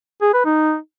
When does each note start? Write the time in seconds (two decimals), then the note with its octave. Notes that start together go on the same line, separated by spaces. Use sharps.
0.22 G#4
0.34 B4
0.46 D#4